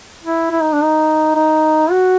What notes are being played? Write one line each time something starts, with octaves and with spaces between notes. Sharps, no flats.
E4
E4
D#4
D4
D#4
D#4
F#4